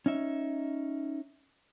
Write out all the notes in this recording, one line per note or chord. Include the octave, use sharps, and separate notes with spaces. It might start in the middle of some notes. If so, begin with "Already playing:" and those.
C#4 D#4 E5